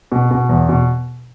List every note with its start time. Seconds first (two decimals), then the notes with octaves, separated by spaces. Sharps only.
0.12 B2
0.31 B2
0.49 E2
0.69 B2